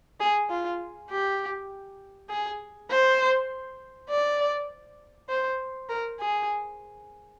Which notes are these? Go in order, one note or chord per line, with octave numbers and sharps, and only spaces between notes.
G#4
F4
G4
G#4
C5
D5
C5
A#4
G#4